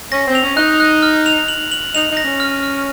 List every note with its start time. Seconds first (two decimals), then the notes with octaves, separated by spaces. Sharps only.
0.11 C#4 A#6
0.27 C4
0.35 F7
0.43 C#4
0.57 D#4 F#6
0.80 F#6
1.02 F6
1.26 F7
1.48 F#7
1.72 F#7
1.94 D#4 F7
2.10 D#4
2.17 A#6
2.24 C#4
2.40 F6
2.63 F6